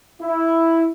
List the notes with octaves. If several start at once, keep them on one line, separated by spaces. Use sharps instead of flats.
E4